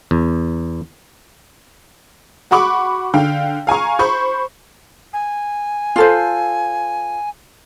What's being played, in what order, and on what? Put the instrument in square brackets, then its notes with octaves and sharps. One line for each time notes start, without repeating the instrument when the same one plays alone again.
[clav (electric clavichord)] E2
[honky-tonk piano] F#4 F#5 B5 C#6 D6
D3 F5 G5
F5 G#5 A#5 C#6
C5 B5 C#6 G6
[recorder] G#5
[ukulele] F4 A4 C5